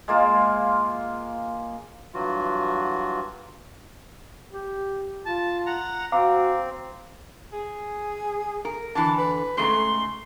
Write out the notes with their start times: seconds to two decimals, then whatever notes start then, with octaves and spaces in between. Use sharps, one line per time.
0.08 G#3 A#3 F4
2.14 G2 E3 F#3 F4 F#4
4.52 G4
5.26 F4 A5
5.66 F#5 A#5
6.12 C4 F#4 F5 A#5 D6
7.53 G#4
8.65 A#4
8.95 D3 E3 A5
9.18 B4
9.57 G#2 C#3 A3 C6